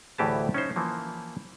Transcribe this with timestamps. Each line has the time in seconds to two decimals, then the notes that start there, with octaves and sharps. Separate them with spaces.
0.18 D2 A2 E3 G4 G#4 A5
0.54 C#4 D#4 C5
0.76 E3 F3 A#3